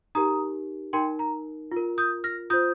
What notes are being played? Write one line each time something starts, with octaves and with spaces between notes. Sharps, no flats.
D#4 G4 A#4 A#5 D#6
D#4 A#4 G5 C6
A#5
F4
A#4
D#6 G6
F6 A#6
F4 C5 D#6 G6